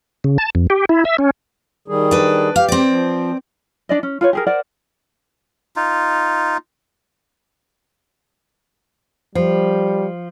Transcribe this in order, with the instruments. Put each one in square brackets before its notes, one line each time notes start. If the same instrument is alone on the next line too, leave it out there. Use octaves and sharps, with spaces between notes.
[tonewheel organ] C#3
A5
F2
G4
E4
E5
C#4
[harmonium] D#3 G3 G#4
[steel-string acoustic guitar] D4 B4
[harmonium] G4 [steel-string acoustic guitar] F5
[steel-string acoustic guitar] C4 D5
[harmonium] F3
[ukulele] D4 D5 D#5
C#4
F4 B4 C#5
G4 G#4 A#4
A#4 C5 D5 F#5
[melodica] D#4 F4
[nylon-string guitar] F3 [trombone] G3